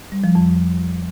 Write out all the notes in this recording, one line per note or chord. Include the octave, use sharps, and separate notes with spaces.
G3
F3
F2